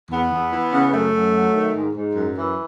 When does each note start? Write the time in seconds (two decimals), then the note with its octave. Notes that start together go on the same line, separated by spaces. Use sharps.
0.11 E2 B3
0.32 E2
0.52 E3
0.72 C#3
0.92 F#2 A3
1.14 F#2
1.34 F#3
1.54 D#3
1.74 G#2
1.95 G#2
2.15 F#2
2.36 E3